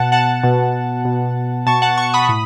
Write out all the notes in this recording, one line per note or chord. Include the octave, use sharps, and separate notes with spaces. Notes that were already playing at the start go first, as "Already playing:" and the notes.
Already playing: B2 F#5 A5
F#5 A5
B2
B2
B2 A5 C#6
F#5 A5
A5 C#6
B5 D#6
A2